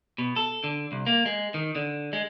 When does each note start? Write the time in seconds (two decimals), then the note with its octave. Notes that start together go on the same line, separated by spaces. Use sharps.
0.18 B2
0.36 A4
0.64 D3
0.92 C2
1.06 A#3
1.26 G#3
1.54 D#3
1.75 D3
2.13 G#3